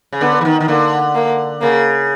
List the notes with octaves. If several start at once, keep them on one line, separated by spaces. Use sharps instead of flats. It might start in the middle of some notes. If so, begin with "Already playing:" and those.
C#3
D3 B3
E3
D#3
D#3
D3 A#3
A#3
C#3 A#3